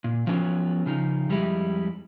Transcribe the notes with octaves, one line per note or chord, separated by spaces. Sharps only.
A#2
F3 F#3 B3 C#4 E4 F4
C#3 F3 D#4
F2 G3 G#3 E4